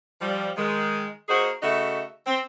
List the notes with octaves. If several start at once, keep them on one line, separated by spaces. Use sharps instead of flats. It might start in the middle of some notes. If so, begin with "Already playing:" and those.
F3 G3
D#3 G#3
A#3 D#4 F#4 G#4 C5
C#3 A3 D#4 F#4 E5
C4